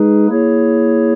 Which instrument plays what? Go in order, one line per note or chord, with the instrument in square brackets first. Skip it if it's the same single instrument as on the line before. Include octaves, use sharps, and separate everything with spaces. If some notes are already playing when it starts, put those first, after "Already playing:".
Already playing: [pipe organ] G#3 D#4 G#4 B4
A#3 E4 G#4 C#5